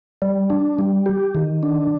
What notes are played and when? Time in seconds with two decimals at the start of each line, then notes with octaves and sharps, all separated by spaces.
0.22 G3
0.50 D4
0.79 G3
1.06 G4
1.35 D#3
1.63 D4